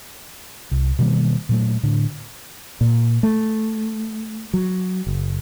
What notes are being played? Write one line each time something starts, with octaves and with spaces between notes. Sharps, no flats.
C2
B2 D#3 G3 A#3
A#2 F#3 A3
A2 D3
A#2
A3
F#3
F#1